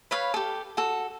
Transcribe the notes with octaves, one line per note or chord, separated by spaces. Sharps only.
B4 C#5 F5 B5
G4 A4
F#4 A4